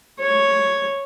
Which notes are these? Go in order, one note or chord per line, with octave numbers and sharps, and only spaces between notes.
C#5